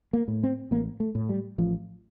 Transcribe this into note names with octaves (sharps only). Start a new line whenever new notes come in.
A#3
A2
C4
A1 A#3
A3
A2
G3
A1 F3